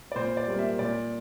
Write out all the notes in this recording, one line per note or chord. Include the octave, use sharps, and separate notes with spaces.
D5
A#2 C5
D5
G3 A#3
E5
A#2 D5